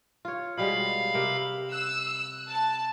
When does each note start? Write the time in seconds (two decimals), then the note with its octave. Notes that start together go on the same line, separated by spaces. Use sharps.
0.25 F4 C#5
0.57 B2 G3 G#3 F5 B5
1.14 C3 A#4 E5
1.72 E6 F#6
2.49 A5